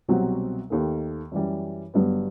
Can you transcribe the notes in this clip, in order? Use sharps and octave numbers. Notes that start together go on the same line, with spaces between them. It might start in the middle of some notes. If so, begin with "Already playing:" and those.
C2 B2 F#3 C4 F#4
D#2 D#3 A3
F#2 E3 G3
G1 G2 F#3 B3